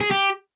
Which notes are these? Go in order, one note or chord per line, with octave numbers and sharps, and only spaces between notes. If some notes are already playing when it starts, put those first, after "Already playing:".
G#4
G4